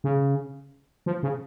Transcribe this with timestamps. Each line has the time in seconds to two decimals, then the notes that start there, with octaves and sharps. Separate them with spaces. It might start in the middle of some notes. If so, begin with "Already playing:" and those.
0.04 C#3
1.06 F3
1.23 C#3